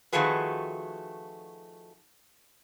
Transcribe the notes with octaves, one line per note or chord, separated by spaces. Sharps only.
D#3 F3 A3 F#4 G#4 B4